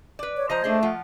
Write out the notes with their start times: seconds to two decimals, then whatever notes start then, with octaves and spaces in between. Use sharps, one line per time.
0.19 B4 D5
0.37 C#5
0.50 F3 C5 D#5 A#5
0.64 A3 D4 G#4 D#5
0.83 F3 F4 F#5